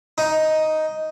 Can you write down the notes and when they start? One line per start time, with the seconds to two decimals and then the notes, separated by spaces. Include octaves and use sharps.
0.18 D#4